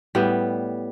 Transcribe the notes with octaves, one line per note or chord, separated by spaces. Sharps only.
A2 G3 B3